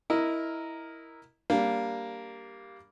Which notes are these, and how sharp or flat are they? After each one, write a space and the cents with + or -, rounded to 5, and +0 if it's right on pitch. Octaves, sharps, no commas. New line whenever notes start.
E4 -5 A#4 +0 D#5 +0
G3 +0 A#3 +0 D4 -15